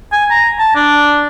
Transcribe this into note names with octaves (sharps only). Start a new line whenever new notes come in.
G#5
A#5
A5
D4